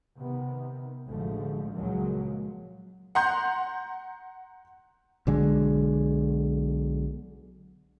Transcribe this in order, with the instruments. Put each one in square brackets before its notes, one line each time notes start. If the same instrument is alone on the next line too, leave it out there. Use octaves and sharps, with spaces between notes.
[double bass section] C3 D#3 B3
A1 D2 D3 F3 G#3 A3
C#2 A#2 F3 F#3 G#3 A#3
[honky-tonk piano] F#5 A#5 C6 G6
[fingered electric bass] B1 D3 G#3